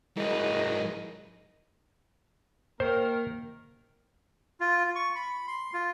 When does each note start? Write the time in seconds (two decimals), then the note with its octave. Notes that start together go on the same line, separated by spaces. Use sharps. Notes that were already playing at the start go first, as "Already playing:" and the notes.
0.17 F#1 G#2 E4 G#4 A#4 B4 D#5
2.80 D#3 A#3 A#4 C5
4.61 F4
4.95 C#6
5.15 B5
5.47 C6
5.74 F4